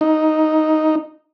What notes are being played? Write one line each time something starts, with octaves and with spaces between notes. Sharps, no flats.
D#4